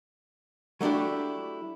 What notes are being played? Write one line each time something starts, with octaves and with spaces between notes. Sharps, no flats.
F#3 A3 D4 E4 G4